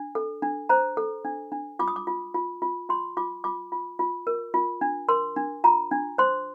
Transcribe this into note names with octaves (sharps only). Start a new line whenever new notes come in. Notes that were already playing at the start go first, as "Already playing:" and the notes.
Already playing: D4
A4
D4
C5 A#5
A4
D4
D4
F4 D6
D#6
D6
F4
F4
F4
F4 C6
F4 D6
F4 D6
F4
F4
A#4
F4
D4
A#4 C6
D4
F4 A#5
D4
C5 C6